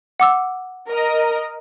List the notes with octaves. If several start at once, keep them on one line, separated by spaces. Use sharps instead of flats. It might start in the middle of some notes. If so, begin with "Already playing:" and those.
F#5 D6 E6
A#4 D#5